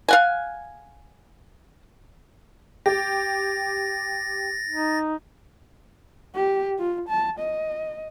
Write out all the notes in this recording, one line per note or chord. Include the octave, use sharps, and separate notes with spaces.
F5 F#5 G#5
G4 A6 A#6
D#4
G4
F4
A5
D#5